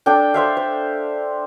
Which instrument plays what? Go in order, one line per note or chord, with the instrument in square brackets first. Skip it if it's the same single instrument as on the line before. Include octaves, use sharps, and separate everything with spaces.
[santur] D4 A4 G5
A4 C5 E5 F5
C5